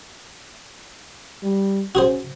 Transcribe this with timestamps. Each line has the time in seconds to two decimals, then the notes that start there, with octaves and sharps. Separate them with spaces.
1.43 G3
1.95 C#4 F#4 G#4 C5